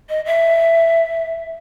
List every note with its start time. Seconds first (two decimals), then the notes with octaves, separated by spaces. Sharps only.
0.09 D#5
0.26 E5